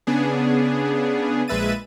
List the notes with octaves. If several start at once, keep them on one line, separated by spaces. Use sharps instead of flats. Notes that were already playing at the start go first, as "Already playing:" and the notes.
C#3 B3 D4 G#4
A#1 G#3 B4 E5 A6 D#7